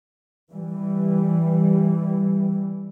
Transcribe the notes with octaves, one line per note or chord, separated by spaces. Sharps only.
E3 G3